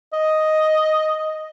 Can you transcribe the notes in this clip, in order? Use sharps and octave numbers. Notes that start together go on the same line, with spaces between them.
D#5